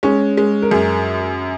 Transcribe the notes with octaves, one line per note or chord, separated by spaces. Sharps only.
G#3 C#4
G#3
A#4
F#2 G#4